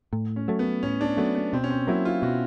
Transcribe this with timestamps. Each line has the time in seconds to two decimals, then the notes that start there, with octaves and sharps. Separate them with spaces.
0.13 A2
0.36 C#4
0.48 F#3 A3
0.59 B3
0.83 A2 C#4
1.01 D4
1.17 F#3 A3 B3
1.35 B3
1.53 B2 C4
1.64 C#4
1.70 C4
1.87 F#3 A#3 E4
2.05 F4
2.22 B2 F#4